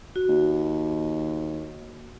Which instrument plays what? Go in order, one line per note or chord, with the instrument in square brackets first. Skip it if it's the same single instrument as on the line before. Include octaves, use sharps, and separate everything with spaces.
[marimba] F#4
[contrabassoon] D#2